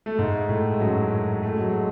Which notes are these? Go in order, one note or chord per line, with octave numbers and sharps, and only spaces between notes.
A3
G#2 G#3
A2 A3
G#3
F#2 F#3
A3
G#3
F#3
G#3